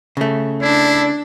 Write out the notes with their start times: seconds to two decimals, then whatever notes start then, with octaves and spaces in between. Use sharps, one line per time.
0.17 C#3 A3
0.62 D4 E4